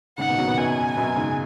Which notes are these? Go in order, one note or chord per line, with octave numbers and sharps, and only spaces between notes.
G#2 C#3 F#5
B2 D#3
C#3 F#3
B2 D#3
F#2 B2 G#5
F#2 B2
G#2 C#3